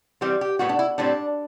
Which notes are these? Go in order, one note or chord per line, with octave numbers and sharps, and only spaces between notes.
E3 G3 C4 G4
G4
A2 G3 B3 F#4
D4
E4
A2 G3 C4 D4